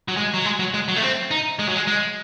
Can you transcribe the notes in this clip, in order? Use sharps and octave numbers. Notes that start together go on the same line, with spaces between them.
F#3
G#3
F#3
G#3
F#3
G#3
F#3
A3
C4
D#4
G#3
F#3
G#3
G#3